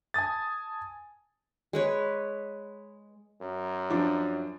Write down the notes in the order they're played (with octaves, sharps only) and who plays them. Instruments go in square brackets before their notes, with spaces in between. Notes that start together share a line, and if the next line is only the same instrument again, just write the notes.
[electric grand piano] G#5 A5 D#6 A6
[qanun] G#3 B4 C#5
[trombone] F#2
[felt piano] F3 D4 D6